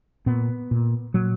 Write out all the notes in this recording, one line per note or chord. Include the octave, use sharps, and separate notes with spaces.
A#2 B3
A#2
A#2 F#3